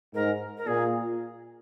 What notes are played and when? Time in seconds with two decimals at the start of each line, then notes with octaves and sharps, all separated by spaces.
0.14 G#2 A#4
0.57 A#4
0.67 A#2 G#4